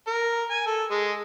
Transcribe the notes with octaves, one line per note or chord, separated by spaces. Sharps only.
A#4
G#5
A4
G#3